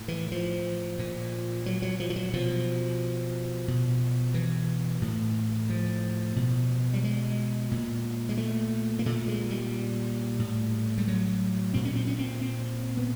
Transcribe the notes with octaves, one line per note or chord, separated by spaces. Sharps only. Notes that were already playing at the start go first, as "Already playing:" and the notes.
Already playing: A2
E3
F3
A#2
F#3
F#3
F3
F3
F#3
B2 F3
B2
E3
A2
F3
B2
G3
G#3
A#2
G#3
A3
A#3
A#2 A3
G#3
G3
A2
G3
F#3
A#2 C4
C#4
C4
C#4
C4
C4
B3